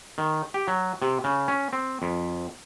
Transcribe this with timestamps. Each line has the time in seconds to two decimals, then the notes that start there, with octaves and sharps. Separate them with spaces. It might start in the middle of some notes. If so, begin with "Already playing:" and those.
0.18 D#3
0.54 G4
0.68 F#3
1.02 C3
1.24 C#3
1.48 C#4
1.73 C4
2.02 F2